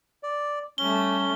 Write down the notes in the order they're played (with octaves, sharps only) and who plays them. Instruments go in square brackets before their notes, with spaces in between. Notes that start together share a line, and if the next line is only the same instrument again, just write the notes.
[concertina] D5
[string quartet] G3 A3 [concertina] C#4 [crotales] G7